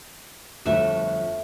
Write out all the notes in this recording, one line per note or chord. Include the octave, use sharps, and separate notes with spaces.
G1 F2 A3 F#4 E5